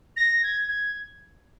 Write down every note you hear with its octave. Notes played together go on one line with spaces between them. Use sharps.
A#6
G#6
G#6